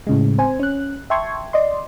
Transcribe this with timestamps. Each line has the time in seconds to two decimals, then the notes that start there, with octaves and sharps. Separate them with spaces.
0.07 A2 C#3 G#3
0.38 C4 C5 G#5
0.59 C#4 F#6
1.10 E5 G5 A5 C6 C#6 G#6
1.53 D5 D#5 C6